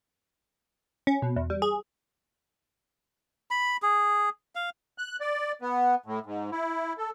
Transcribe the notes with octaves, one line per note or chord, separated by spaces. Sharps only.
C#4
B2
E2
G3
G#4
B5
G#4
F5
F#6
D5
B3
A2
G#2
E4
A4